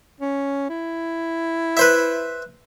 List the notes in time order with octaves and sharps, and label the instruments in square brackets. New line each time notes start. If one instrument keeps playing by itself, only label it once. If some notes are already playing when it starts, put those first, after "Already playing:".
[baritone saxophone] C#4
E4
[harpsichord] B4 C5 E5